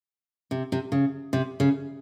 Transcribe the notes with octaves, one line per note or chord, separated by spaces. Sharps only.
C3
C3
C#3
C3
C#3